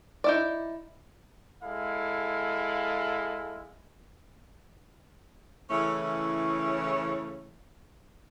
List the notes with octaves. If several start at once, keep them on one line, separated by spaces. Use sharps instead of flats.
D#4 E4 D5
G#3 E4 A4 F5
C#3 E3 A3 C#4 E4 C#5